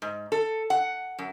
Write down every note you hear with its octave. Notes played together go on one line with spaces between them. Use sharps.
G#2
A4
F#5
F#2